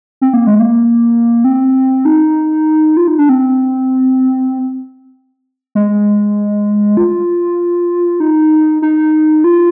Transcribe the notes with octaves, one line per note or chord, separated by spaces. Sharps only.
C4
A#3
G#3
A#3
C4
D#4
F4
D#4
D4
C4
G#3
F4
D#4
D#4
F4